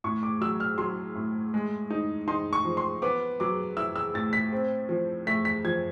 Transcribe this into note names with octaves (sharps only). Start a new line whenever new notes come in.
A2 C#6
D6
F#3 E6
F6
F#3 C6
A2
G#3
D#4
D#4 C6
C#6
F3
C6
B3 D6
F#3 D6
E4 E6
E6
A2 A6
B6
C4
F3
A3 B6
B6
F3 G#6